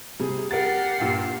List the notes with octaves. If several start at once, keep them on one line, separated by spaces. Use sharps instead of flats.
C3 G3 G#4
G4 A#4 F#5 A6 C7
G2 A#2 G5